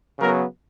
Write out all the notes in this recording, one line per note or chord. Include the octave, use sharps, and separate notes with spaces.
C#3 F#3 B3 A#4